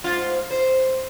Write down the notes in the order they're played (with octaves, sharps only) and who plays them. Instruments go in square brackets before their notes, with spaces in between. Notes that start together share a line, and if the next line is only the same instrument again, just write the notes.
[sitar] G#2 F4
C5